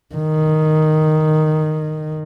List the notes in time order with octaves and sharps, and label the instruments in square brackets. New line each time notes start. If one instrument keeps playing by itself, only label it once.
[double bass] D#3